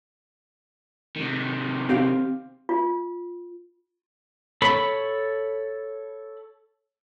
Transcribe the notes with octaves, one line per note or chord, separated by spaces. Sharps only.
C3 D#3
C4 G4 F5
F4
A4 C#5 B5